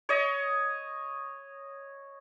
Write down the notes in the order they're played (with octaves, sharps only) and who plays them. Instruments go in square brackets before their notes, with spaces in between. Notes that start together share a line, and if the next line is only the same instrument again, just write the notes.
[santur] C#5 D#5